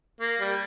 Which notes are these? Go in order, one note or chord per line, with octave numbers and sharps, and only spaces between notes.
A#3
G3